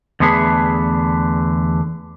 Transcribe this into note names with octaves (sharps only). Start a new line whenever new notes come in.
E2 D3 A3 G#4 B4